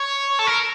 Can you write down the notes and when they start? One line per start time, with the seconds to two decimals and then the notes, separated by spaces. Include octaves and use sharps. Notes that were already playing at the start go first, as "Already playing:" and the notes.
Already playing: C#5
0.39 A4
0.47 A#4